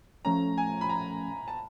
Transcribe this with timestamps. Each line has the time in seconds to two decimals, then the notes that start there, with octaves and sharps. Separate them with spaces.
0.25 F3 A3 C#4 A#5
0.58 G#5
0.81 B5
0.89 A#5
1.48 A5